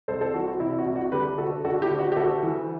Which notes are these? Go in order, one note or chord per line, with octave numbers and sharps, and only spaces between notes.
C2 A4 C5
A4 C5
E3 F#4
F#4
C3 E4
E4
F#4
C2
F#4
D3 G4 B4
D2 F#4 A4
D3 F#4 A4
E4 G4
D2
F#4
G4
D2 F#4 A4
E3